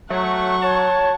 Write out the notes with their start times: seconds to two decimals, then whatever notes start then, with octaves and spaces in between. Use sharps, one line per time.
0.10 F#3 A3 F#5 C#6
0.63 C#5 A5